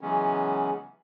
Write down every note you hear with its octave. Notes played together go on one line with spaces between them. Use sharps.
C#3 E3 F#3 G#3 B3 C#4